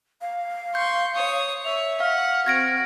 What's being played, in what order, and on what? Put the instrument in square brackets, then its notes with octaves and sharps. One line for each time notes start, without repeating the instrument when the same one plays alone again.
[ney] F5
[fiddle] C6 C#6 [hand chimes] G6
[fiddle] C#5 D#6
[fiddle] C#5 [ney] E5 [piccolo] F7
[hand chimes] F5 [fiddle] F#5 [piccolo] F6
[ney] C4 [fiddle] F#4 [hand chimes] G#6 A#6 D7